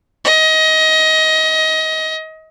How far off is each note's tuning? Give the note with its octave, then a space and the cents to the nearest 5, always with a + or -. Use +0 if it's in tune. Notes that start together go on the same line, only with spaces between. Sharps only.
D#5 +25